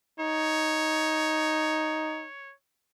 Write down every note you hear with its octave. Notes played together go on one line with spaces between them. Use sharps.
D#4 C#5